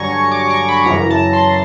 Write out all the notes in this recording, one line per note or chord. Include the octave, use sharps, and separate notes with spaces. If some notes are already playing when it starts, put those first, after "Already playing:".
Already playing: G2 D3 F#3 G#5 A#5 C#6
D6
C#6
B5
F#2 C#3 E3 A#5
A5
C6